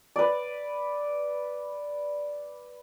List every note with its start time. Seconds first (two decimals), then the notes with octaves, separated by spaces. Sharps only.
0.16 B4 D5